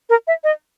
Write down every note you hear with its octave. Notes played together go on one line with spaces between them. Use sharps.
A#4
E5
D#5